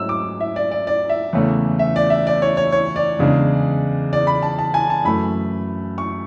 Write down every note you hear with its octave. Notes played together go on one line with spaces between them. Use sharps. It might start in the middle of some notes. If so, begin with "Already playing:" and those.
Already playing: G#2 F#3 A3 C#4 E4 E6
D6
E5
D5
D5
D5
E5
E2 C#3 E3 A3 C#4
E5
D5
E5
D5
C#5
C#5
C#5
D5
E2 C#3 G#3 D4
D5
B5
A5
A5
G#5
A5
F#2 E3 A3 B5
C#6